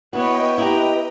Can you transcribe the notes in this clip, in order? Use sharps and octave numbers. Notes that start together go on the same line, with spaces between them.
B3 E4 F#4 B4 C#5 D#5 G5
E4 G4 A#5